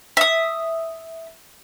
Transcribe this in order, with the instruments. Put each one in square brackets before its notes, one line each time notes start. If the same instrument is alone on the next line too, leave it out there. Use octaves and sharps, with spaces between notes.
[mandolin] E5 D#6